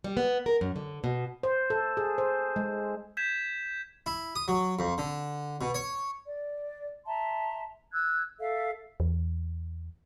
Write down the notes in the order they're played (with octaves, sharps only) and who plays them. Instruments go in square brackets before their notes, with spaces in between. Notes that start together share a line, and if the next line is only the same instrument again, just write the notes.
[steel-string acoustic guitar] G3
B3
A#4
F#2
D3
B2
[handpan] C5
A4
G#4
C5
G#3
[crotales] G6 G#6 B6 E7
[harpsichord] E4
D#6
F#3
F2
D3
B2
C#5
[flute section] D5
E5 A5 A#5 C6
E6 F#6 G#6
A4 E5 F5
[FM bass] E2